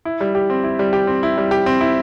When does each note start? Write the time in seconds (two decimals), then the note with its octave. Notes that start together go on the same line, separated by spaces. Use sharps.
0.05 E4
0.21 G3
0.35 G4
0.50 C4
0.63 E4
0.79 G3
0.93 G4
1.07 C4
1.23 E4
1.38 G3
1.51 G4
1.66 C4
1.81 E4